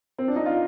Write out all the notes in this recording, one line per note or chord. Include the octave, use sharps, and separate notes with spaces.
C4
D4
D#4
F4